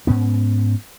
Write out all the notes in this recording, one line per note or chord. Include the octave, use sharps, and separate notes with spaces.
G#2 B3 C#4